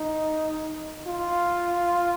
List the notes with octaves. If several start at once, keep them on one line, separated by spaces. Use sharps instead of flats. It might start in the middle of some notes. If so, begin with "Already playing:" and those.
Already playing: D#4
F4